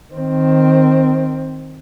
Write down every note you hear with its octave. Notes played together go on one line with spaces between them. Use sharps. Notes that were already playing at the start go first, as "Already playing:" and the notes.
D#3 C4